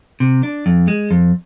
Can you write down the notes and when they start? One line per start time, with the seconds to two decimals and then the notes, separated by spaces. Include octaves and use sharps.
0.20 C3
0.43 D4
0.66 F2
0.88 G#3
1.11 F2